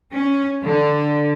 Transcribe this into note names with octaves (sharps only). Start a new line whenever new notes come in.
C#4
D3